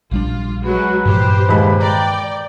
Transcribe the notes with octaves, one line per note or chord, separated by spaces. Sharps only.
A#1 G3 D4 F4
F#3 G#3 F#4 B4
G2 A#2 E3 G4 C5
D#2 G#3 B5
D5 G5 A#5